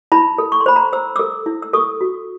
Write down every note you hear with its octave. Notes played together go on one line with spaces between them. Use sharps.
E4 A5 B5
A4
C#6
C6
C5 B5
A#5 C6
C5 E6
A4 D6 E6
E4
E6
A4 C#6 D#6
F#4